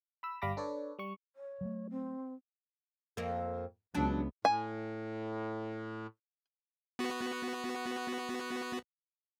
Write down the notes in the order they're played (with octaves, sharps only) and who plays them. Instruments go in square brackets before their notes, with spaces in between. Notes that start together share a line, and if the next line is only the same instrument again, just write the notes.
[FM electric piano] B5 E6
G1 G3 F5 B5 D6 A#6
D4 A4 B4 C#5 D5
G3 C#6
[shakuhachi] C#5
[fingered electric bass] F#3 G3 A3
[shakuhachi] C4
[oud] F2 A#3
[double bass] C#2 B3 [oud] F#3 D4
[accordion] A2 [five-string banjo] G#5
[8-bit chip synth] B3 F#4